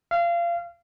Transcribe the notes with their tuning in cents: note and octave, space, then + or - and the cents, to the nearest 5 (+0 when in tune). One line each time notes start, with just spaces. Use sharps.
F5 -25